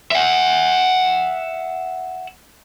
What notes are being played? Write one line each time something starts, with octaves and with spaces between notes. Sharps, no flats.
E5 F#5